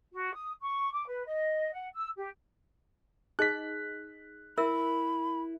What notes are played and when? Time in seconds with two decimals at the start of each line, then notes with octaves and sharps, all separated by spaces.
0.13 F#4
0.34 D#6
0.62 C#6
0.92 D6
1.06 B4
1.26 D#5
1.72 F#5
1.93 E6
2.16 G4
3.39 D#4 G#4 D#5 F#6 B6
4.58 E4 A#4 E5 B5 E6